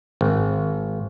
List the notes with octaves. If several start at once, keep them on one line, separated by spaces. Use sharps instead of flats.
G#1